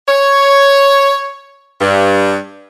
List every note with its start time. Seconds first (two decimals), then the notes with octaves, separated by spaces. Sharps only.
0.07 C#5
1.80 G2